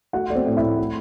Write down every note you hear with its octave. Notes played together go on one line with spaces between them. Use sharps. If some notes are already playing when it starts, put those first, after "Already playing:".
A3 F#4 F#5
A3 D5
C4 C5
A2
E4 E5
A2
A3